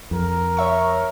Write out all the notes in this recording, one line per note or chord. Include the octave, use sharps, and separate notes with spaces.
F2 A#4
C#5 E5 C#6